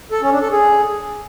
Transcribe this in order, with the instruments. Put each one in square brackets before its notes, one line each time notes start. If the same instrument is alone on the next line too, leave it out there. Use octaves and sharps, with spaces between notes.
[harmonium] A4
C#4
D4
A4
G#4